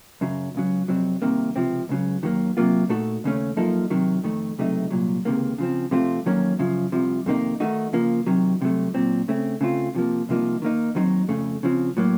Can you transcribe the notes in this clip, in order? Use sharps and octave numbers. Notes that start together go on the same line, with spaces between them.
F#2 C#3 F#3
C#2 C#3 F#3
F2 C3 F#3 C4
C2 C3 D#3 A#3
C#2 C3 F3 C4
C#2 C#3 F#3
D#2 D#3 F#3 A#3
C3 F#3 A#3 F4
A#2 A3 D#4 F#4 A4
D#2 C#3 A3 C#4
F#2 F3 A#3 D#4 A4
C3 D#3 F#3
F2 D#3 A3
C#2 C3 F#3 A3 D#4
C2 A#2 F#3
C#2 C3 D#3 A#3
C#3 F3 C4
C3 F3 A3 C4 F4
F2 D#3 F#3 A#3 C#4
F#2 C#3 F3
C2 C3 F3
F2 C3 D#3 A#3 D#4
D#3 A3 D#4 F#4
C#3 F3 A#3
C3 D#3 F#3
C2 C3 F#3 A3
A#2 F#3 C4
C#3 A3 C4
C#3 A3 C4 F4
C3 F3 A#3
C2 C3 F3 A#3 D#4
D#3 A#3 D#4
D#2 D#3 F#3 C4 D#4
F2 C#3 A3
C#3 F3 C4
A2 F#3 A#3